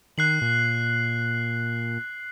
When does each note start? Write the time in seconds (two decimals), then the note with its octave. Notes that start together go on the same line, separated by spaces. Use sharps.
0.18 D#3 F#6 C7 F#7
0.42 A#2